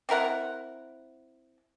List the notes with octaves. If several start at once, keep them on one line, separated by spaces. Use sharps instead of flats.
C4 E4 A#4 F#5